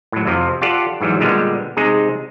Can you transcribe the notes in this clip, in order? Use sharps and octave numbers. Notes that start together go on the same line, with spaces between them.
A2 F#3
F2 C3 F3
F4 G4 A4 D5 F#5
G#2 E3 F#3 G3
A#2 D3 G3 G#3 B3
C3 G#3 D#4 G#4